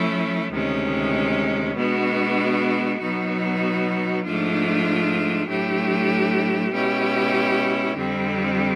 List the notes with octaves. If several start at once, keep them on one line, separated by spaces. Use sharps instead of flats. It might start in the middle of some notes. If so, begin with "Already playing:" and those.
Already playing: F3 A3 C#4 E4
D2 C3 D#3 G#3 C#4
B2 G#3 B3 D4 F#4
B2 F#3 B3 D#4 F#4
G#2 F3 A3 D4 F4
A2 F#3 A3 D4 G4
B2 G#3 C#4 E4 G4
F2 D3 G3 C4